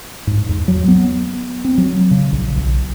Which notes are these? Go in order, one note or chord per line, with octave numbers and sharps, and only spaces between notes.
G#2
E2
F#3
B3
C4
F#3
C#3
A#1
B1